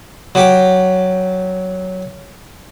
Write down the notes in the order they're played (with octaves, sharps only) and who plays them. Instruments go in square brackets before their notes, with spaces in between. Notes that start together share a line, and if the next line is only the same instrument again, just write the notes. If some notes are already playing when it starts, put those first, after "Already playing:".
[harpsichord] F#3 G4 G5